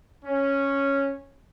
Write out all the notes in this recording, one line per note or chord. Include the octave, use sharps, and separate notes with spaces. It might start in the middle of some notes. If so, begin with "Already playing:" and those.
C#4